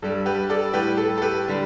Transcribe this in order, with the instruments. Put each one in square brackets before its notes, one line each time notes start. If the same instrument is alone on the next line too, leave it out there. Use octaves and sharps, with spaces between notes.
[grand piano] G2 G3 A4
G4 B4
A4 D5
A2 G3 G4 B4
A4
A4
G4 B4
D3 G3